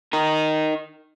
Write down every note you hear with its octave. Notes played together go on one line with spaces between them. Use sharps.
D#4 A#4